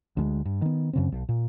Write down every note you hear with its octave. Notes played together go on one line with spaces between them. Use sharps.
D2 G3 G#3
G2
D#3 B3
F#2 C#3 C4
B1
A#2